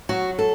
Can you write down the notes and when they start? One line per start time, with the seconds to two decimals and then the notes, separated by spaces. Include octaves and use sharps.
0.09 F#3 F#4
0.39 A4